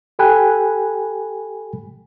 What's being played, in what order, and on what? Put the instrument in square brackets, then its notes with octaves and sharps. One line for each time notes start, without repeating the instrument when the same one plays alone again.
[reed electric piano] G4 A4 G5 G#5 B5 F#6